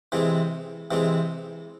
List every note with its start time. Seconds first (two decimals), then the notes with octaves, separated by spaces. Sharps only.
0.12 C3 E3 G#3 C4
0.91 C3 E3 G#3 C4